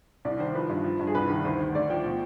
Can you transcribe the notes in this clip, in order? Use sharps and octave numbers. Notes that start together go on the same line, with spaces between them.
C2 D5
D#3 C5
F3 B4
G2
F3
G2
G#4
C2 B4
D#3
D2 C5
D#3
D2 D5
F3 G5
B2